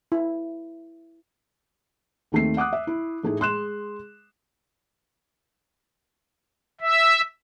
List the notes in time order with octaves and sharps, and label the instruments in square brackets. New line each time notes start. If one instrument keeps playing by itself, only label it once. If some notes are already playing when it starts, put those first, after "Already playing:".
[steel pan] E4
[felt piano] D#2 D#3 A3 C4 C7
F#5 D6 D#6 F#6
E5
E4
A2 A3 D#4 G#4
G#3 C6 F#6 E7
[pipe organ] E5